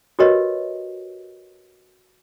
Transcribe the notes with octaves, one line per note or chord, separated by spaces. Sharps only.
F#4 G4 A#4 B4 C#5 D#5